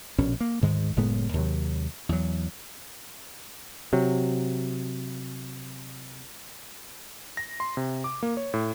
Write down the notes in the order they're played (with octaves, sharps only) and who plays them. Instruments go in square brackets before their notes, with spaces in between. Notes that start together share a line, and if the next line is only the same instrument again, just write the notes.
[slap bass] A#1 B2 C#4
A#3
D2 G#2 D#3 G#3
F#1 A2 G#3 B3
D#2 C3 F#3
E2 F#3
[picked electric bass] C3 F#3
[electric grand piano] A#6
C6
C3
D6
A#3
C#5
A2